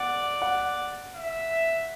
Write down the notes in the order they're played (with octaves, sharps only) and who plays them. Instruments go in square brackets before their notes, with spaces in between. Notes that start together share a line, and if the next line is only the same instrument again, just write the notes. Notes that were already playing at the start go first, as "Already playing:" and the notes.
Already playing: [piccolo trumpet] D5 [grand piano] F#5
[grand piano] F#5
[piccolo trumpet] E5